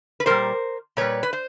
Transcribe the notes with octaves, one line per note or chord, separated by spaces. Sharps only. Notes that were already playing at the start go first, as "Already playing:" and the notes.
B4
A#2 G3 A#4 C5
A#2 G3 B4 C#5
B4
C5